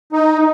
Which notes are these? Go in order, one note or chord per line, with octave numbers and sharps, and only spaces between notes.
D#4